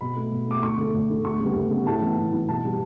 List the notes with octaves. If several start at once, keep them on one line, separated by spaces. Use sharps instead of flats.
B2 B5
A3
B2
A3 D6
D2 C#6
D3 A3
D2
D3 A3
D2 C#6
C#3 G3 B3
D2
C#3 G3 B3
A2 A5
E3 B3
A2
E3 B3
B2 A5
G3 B3